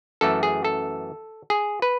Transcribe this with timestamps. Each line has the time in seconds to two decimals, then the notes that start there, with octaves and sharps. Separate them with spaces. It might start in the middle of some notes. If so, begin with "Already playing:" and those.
0.21 F#2 E3 A3 A4
0.43 G#4
0.65 A4
1.50 G#4
1.82 B4